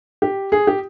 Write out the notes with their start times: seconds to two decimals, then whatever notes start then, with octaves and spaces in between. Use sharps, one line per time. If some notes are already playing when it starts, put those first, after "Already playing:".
0.22 G4
0.52 G#4
0.67 G4